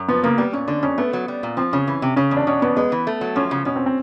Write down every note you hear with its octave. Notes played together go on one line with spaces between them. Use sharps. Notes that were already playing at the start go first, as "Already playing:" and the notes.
Already playing: F#2
F3 B3
C#3 A#3
G3 B3
A#2 C#4
D3 D4
F2 C#4
A3 B3
F#3
G3
A#2
F3 C4
C#3 C#4
E3
C3
C#3 C#4
E2
D4
B2 C#4
E2 B3
G#3 B3
E3
A3
F#3
F3 C#4
C#3
B2 C#4
C4
C4